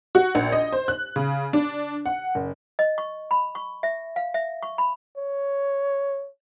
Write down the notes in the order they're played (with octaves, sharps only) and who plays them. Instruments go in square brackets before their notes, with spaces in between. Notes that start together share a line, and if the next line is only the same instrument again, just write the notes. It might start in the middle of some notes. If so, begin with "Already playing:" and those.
[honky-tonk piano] F#4
A#1
D#5
C5
F#6
C#3
D4
F#5
F#1
[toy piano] D#5
C#6
B5
C#6
E5
F5
E5
C#6
B5
[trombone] C#5